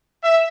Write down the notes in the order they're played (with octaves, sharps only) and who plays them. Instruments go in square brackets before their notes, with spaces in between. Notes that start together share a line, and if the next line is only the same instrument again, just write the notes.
[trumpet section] E5